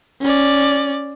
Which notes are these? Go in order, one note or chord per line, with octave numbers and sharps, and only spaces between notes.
C#4 D5